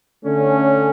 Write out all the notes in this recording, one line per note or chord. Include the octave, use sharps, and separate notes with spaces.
D3 A3 C#4